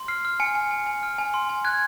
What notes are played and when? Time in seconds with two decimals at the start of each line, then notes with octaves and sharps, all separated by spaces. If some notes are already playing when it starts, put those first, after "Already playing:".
Already playing: C6
0.08 F6 C7
0.25 F6
0.40 G#5 C#7
0.55 G#5
0.71 G#5
0.87 G#5
1.03 F6
1.18 G#5
1.34 C6
1.49 G#5
1.65 F#6 G#6